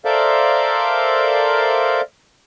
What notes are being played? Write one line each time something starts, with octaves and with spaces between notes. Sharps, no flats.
A4 A#4 C5 D5 E5 F5